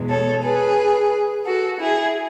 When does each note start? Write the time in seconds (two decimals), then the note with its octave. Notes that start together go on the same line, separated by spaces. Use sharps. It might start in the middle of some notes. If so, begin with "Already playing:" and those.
Already playing: E2 B2 G#3
0.09 A4 C#5
0.43 G#4 B4
1.46 F#4 A4
1.80 E4 G#4